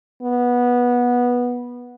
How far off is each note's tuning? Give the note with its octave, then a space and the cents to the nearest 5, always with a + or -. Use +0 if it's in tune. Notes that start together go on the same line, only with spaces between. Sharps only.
B3 -15